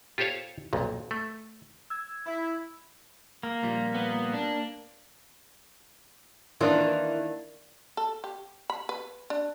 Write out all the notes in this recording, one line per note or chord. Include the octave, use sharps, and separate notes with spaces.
F4 G4 A4 C5 C#5 F5
B1 F2 A#2
A3
E6 G#6
E4
A#3
A#2 F3 G3
B3
D4
D#3 E3 A#3 D4 E4 F4
A4
G4
B5
B4
D4